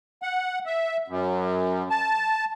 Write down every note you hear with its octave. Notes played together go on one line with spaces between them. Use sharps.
F#5
E5
F#2
A5